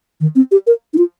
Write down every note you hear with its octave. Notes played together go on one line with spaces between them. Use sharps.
D#3
C4
G4
A#4
D#4
F4